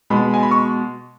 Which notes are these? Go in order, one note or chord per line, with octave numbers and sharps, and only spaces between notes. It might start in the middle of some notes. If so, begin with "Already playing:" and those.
B2 G#3 B5
G#5
B5
C#6